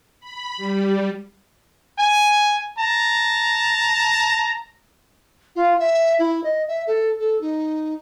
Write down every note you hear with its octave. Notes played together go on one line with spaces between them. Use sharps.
B5
G3
G#5
A5 A#5
F4
E5
E4
D#5
E5
A4
A4
D#4